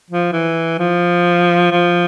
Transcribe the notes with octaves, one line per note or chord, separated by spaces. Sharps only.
F3
E3
F3
F3